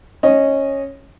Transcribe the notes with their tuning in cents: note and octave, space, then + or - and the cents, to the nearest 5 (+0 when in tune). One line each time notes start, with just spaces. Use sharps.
C#4 -10 D#5 +0